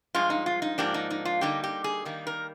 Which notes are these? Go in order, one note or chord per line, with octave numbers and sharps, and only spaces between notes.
G2 F3 G#3 F4
D#4
F4
D#4
G#2 F3 A#3 D4 G4
D#4
D#4
F4
D3 G3 A#3 D#4 G4
G4
G#4
D#3 G3 A#3 D#4
A#4